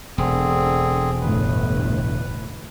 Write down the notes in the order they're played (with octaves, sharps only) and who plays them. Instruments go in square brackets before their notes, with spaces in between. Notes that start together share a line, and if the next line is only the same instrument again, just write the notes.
[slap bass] E1 [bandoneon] D3 C4 G#4
[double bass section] G1 A2 [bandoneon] B4